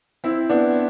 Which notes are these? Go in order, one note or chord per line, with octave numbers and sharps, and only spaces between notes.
C4 E4
B3 D4